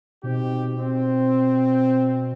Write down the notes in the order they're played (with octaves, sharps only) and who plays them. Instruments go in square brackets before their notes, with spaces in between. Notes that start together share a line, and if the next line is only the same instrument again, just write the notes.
[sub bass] B2 [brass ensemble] C4 D#4 G4
[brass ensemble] C4